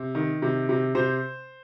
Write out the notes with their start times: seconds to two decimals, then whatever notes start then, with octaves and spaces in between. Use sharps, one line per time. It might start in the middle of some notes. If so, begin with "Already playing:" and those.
Already playing: C3
0.15 D#3
0.42 C3
0.69 C3
0.95 C3 C5